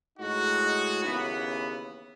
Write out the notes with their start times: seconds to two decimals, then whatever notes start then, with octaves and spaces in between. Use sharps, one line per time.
0.19 A2 G#3 D#4 F#4
1.03 D#2 C#3 E3 B3